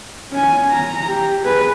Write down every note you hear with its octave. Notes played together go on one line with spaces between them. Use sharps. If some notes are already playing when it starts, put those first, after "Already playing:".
C#4 G#5
A#5
G4
G#4 B4